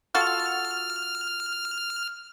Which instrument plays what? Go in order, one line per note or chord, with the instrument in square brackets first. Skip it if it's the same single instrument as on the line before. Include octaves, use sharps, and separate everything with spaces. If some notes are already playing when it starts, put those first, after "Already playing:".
[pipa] F4 F#4 A4 [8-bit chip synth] F6